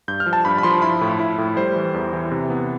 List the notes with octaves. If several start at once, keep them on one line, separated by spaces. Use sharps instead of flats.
G2 G6
F6
F3
A5
G2 B5
B5
F3 C6
E4 B5
A2
E4
A2
G3 C5
E3
E2
E3
C3
B3